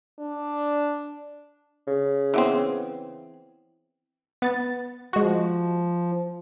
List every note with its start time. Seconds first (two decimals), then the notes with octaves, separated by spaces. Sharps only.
0.19 D4
1.87 C#3
2.34 E3 B3 C4
4.42 B3 A6
5.13 F3 G#3 F#4